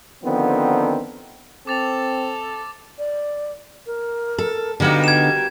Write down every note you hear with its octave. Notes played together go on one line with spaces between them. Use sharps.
D3 D#3 F3 B3 C4
C4 A4 D6 A6 F7
D5
A#4
A4
D3 G3 A#3 B3 D#4 F#4 G4
G#6 E7